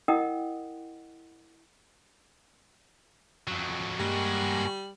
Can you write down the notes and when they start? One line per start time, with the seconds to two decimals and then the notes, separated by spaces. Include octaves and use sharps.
0.08 E4 A#4 D#5 F#5 G5 D#6
3.48 F2 F#3
4.00 G2 G3 G#3 A#3 F#4